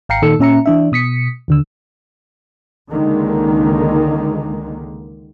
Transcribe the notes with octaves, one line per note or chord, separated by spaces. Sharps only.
G#1 F5 G5 A#5 C7 C#7
A#2 D#3 D#4 A4 E6 C#7
A#2 C#4 E5 A#5 C#7
E3 D4 E5
B2 D#6 B6 C#7
D#2 D3 E6
C#2 D3 D#3 G#3 A#3